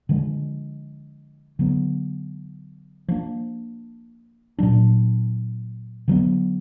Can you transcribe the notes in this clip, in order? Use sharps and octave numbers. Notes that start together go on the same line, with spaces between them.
D3 F3 G#3
D3 F#3 B3
F3 A#3 D4
A#2 F#3 D4
D3 F#3 B3